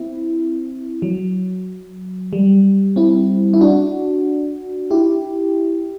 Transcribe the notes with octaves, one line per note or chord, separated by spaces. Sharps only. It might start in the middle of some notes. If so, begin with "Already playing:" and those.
Already playing: C4 E4
F#3
G3
C4 E4
E4
D4 F#4
E4 G4